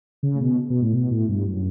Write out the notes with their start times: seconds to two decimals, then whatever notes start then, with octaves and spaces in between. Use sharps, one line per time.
0.23 C#3
0.35 A2
0.41 B2
0.70 B2
0.82 A2
0.93 B2
1.11 A2
1.28 G2
1.45 F#2